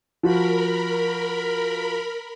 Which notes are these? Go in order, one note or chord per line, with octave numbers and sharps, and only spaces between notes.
F3 F#4 A#4 B5